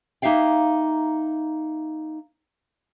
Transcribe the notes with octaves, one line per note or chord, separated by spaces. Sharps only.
A#3 D#4 G4 E5 F5 G5